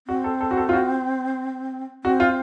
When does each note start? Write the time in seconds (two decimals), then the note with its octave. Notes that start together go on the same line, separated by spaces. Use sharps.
0.07 C4 F#4
0.24 A4
0.40 A4
0.51 F#4
0.57 A4
0.69 F4
0.73 F#4
2.04 C4 F#4
2.20 F4